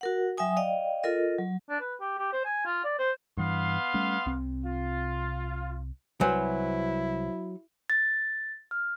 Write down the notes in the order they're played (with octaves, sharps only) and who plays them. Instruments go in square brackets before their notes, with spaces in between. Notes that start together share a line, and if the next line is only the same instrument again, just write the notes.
[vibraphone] F#4 A#4 F#5
F#3 E5 G5 G#5 D#6
D5 D#5 F5 G5
F4 A4 A#4 D#5
F#3
[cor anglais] D4
B4
G4
G4
C5
G#5
F4
D5
C5
[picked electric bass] G2 E3 [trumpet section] B3 F5 C6
[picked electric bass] G3 A3 C#4
C2 C3 C4
[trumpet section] F4
[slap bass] C2 [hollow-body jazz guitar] F#3 [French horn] E4 [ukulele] B4 C5 G#5
[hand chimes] A6
F6